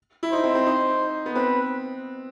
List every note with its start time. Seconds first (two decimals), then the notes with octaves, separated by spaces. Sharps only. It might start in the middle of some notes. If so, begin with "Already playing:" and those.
0.23 E4
0.33 D#4 C5
0.44 C4
0.55 C4
0.67 D#4
1.26 B3
1.35 C4 B4